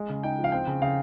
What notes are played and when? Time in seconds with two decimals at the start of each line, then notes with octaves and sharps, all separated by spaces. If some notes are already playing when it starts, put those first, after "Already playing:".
Already playing: G#3
0.09 C#3
0.23 D#4 G5
0.39 F3
0.44 F5
0.52 C4 G5
0.67 C#3
0.82 C#3 F5